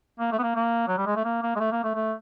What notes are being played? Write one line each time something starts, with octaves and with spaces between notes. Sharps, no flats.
A#3
A3
B3
A#3
A#3
F#3
G3
G#3
A3
A#3
A#3
G#3
A3
A#3
A3
A3